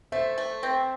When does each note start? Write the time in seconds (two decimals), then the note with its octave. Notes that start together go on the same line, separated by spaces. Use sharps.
0.12 A3 C5 E5
0.38 A3
0.63 C4